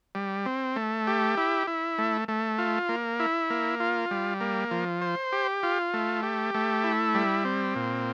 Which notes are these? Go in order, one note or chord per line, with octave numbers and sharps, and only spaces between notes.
G3
C4
A3
G4
E4
E4
A3
A3
F4
A#3
E4
A#3
F4
G3
A#3
F3
C5
G4
F4
A3
G4
A3
E4
G3
C4
A#2